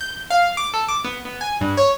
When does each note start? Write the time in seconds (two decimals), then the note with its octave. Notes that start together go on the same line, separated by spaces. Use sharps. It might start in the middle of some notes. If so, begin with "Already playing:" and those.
0.01 G6
0.30 F5
0.57 D6
0.74 A4
0.88 D6
1.05 B3
1.25 B3
1.41 G#5
1.61 G2
1.77 C#5